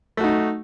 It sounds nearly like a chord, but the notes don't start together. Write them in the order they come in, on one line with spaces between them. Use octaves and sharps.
A3 F#4 D#4